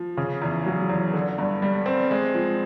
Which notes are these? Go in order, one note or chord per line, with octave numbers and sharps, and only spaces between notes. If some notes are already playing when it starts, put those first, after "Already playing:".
Already playing: F3
C#3
E2
F#3
E2
D3
G2
G3
C4
G#3
F3